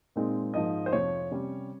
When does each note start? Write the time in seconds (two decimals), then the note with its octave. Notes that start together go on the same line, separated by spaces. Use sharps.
0.16 A#2 G#3 C4 D#4
0.54 G#2 F3 A#3 D#4 D#5
0.86 C5
0.92 F2 C3 F3 C#5
1.31 C3 G3 C#4